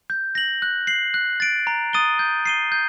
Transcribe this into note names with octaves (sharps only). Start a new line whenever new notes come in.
G6
A#6 F#7
F#6
C7 F#7
F#6
A6 D7
A#5
D#6 A6 D#7 G7
G6
C7 D#7 G7
G6